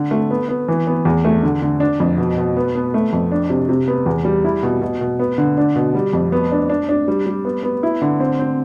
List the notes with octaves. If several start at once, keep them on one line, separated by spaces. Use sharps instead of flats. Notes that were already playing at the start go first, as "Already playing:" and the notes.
Already playing: D3
A3
B3
B3
E3
B3
E2
A3
D3
D3
D4
F2
B2
B2
B3
B3
A3
F2
D4
C3
C3
B3
E2
G3
E4
B2
B2
B2
B3
D3
D4
B2
G3
F2
B3
D4
D4
D4
G3
G3
B3
B3
E4
D3
C4
C4